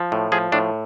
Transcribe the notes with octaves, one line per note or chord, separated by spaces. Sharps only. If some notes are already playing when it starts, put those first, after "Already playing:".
Already playing: F3
A2
F3 G#4
A2 D4